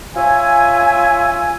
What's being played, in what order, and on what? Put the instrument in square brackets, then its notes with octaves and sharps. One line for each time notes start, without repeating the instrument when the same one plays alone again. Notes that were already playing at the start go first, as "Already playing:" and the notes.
[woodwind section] F4 C#5 E5 G#5